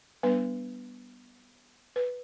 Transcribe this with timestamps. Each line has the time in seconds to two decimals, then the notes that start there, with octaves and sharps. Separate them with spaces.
0.23 G3 B3 D4 B4
1.96 B4